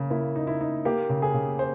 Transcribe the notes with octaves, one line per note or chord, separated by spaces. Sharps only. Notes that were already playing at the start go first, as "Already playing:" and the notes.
Already playing: C#3 A#3 A#4
A#3 E4
D#4
E4
D#4
A#3 G4
C#3
G#4
C#3
C5